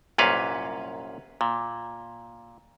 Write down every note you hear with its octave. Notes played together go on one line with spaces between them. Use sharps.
C2 F#2 A#2 C#4 B4 F5
A#2